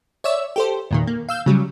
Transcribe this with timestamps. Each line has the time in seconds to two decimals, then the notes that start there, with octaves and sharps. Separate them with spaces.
0.24 C#5 D5 E5 E6
0.56 G4 A4 C5
0.91 E2 A#2 D#3
1.07 A#3
1.29 F5 E6 G6
1.46 C#3 F#3 G3